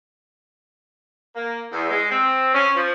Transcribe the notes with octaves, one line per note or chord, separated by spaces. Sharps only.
A#3
E2
G#3
C4
C#4
F3